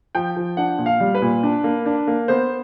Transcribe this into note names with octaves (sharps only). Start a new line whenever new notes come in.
F3 G5
F3
D4 F#5
A#2
F5
G3
B4
A#2
D4
A#3
D4
A#3
B3 C5